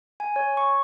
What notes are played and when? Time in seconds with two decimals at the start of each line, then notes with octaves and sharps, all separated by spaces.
0.20 G#5
0.36 C#5
0.57 C#6